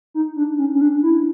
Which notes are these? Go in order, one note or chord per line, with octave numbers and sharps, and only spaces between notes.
D#4
D4
C#4
C#4
D4
E4